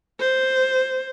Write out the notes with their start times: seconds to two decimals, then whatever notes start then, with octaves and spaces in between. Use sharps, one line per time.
0.19 C5